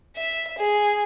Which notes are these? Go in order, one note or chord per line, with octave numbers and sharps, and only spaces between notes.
E5
G#4